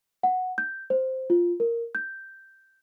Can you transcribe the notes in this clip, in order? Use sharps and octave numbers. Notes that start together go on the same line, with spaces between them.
F#5
G6
C5
F4
A#4
G6